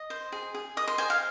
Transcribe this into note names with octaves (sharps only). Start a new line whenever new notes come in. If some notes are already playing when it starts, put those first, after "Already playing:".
Already playing: D#5
C5
G#4
G#4
D#5 D#6
C6
C5 G#5
F5